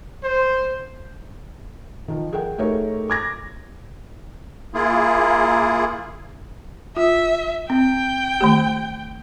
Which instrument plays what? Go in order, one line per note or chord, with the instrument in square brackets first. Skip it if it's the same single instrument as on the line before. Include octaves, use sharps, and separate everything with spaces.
[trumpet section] C5
[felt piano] D#3 F3
G#4 A#4 F#5 G5
A3 D#4 G4 G#4 A#4 C#5
D6 G#6 A#6
[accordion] A#3 E4 F4 G#4
[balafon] F4 [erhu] E5
[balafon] C4 [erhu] G5
[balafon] D#3 A3 G4